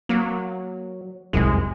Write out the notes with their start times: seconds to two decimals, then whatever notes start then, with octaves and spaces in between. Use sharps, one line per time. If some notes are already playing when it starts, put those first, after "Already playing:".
0.09 F#3 A#3
1.33 F1 C2 F#2 G#3